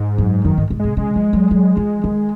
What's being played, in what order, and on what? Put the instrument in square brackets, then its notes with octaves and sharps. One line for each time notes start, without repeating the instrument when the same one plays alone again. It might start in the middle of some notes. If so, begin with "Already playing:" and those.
Already playing: [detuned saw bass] G#2
[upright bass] F#2
[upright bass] F#2 [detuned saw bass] D#3
[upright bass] G#2
G#2
[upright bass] C3 [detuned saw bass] G#3
[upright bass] C#3 [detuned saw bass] G#3
[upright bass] F3
F#3
F#3
F3
D#3